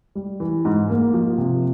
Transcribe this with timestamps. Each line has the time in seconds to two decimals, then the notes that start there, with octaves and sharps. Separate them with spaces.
0.15 G3
0.40 E3
0.65 G#2
0.90 A#3
1.14 F3
1.38 C3